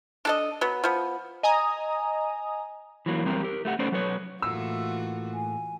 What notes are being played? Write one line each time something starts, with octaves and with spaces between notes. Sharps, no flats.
D4 A4 D#5
F#3 B3
F3 B3
D#5 G#5 A#5 D#6
E3 F#3 A#3
E2 G3 C4 G4 A#4
G4 A#4
A3 G4 F#5
A3 C#4 A4 B4 C5 D5
F#3 A4 B4 C#5
A2 E3 A3 A#3 F4 F#4 E6
G#5